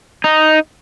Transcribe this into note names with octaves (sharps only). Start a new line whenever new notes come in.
D#4